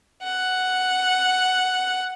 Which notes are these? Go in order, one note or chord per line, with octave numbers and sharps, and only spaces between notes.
F#5